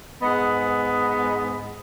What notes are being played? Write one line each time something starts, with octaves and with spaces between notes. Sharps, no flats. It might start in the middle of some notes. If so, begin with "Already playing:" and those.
G#2 B3 D#5 F#5